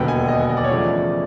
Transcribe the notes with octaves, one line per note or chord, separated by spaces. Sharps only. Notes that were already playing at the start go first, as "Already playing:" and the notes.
Already playing: E1 D#2 D3 F#3 B3 G5
G#5
D#5
D#5
D5
C#5
E2 C#3 F3 A3 D5